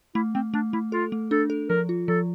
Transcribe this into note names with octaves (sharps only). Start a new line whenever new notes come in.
A3 E4
A3 C4
A3 D4
A3 E4
F4 A4
A3
D4 A4
A4
F3 A#4
F4
F3 A4